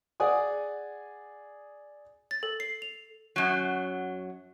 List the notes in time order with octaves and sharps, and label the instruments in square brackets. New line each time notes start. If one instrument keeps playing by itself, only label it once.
[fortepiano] G#4 D5 F#5 G#5 D#6
[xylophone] A6
A4
C7
F7
[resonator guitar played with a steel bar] F#2 F#3